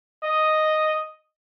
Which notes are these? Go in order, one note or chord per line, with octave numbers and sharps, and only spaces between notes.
D#5